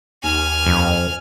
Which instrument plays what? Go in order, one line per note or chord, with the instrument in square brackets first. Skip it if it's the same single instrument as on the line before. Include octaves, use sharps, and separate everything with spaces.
[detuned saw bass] D#2 [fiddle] G#5 F6
[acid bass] F2